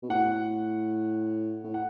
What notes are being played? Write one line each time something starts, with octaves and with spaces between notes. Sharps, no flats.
B2
A2 F#5
A2
F#5